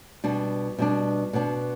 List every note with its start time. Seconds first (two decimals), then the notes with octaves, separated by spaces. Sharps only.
0.24 B2 G3 D4
0.78 B2 G3 D4
1.33 B2 B3 D4